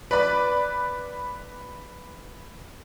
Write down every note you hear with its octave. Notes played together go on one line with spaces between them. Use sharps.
B4 D5 B5